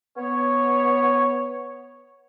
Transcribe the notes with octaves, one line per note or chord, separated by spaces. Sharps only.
B3 C#5